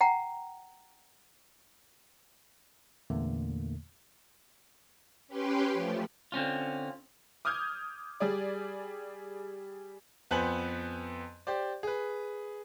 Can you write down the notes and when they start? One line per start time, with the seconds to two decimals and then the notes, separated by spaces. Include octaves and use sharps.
0.01 F#5 G5 A#5
3.10 E2 A#2 D3 A3 A#3
5.28 C#4 G4 B4 G5 C6
5.73 F3 A3
6.32 D3 C4 C#4 F4
7.45 D6 D#6 F6 G6 G#6
8.20 G3 G#4 D5
10.31 F2 B3 B4 C5 G#5 F#7
11.47 G4 C5 D5
11.83 G#4 B4